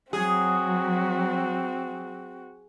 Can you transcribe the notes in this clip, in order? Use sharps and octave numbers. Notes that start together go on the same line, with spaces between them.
F#3 C4 F#4 G#4